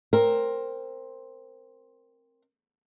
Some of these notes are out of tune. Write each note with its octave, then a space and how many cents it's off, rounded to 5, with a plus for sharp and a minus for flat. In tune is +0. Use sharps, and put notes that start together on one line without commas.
C4 +10 A#4 +0